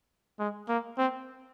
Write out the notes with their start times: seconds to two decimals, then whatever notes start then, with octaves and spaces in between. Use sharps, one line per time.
0.39 G#3
0.69 A#3
0.98 C4